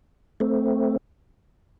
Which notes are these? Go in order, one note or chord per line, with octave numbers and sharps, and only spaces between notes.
A3 C4